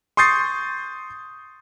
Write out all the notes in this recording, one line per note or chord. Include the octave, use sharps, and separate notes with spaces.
C6 C#6 D#6 G6 A6 C7